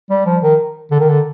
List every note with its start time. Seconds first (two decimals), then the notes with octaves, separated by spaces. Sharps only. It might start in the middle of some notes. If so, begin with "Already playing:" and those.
0.10 G3
0.26 F3
0.42 D#3
0.91 D3
1.00 D#3
1.09 D3